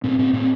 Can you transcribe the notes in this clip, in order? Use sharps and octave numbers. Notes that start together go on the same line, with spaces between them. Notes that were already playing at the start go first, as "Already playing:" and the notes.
A2 C4
A2 C4
A2 C4